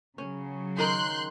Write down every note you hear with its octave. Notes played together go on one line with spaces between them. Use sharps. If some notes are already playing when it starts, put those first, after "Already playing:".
C#3 F#3 C#4
D#3 A#4 C6 F#6 G6